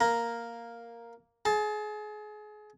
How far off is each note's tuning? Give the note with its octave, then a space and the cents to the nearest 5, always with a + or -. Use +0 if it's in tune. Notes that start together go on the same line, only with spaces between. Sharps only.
A#3 +0 A#5 +0
G#4 +30 A5 +0